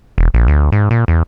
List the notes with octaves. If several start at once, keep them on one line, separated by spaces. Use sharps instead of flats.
E1
A#1
D2
G#2
A#2
E2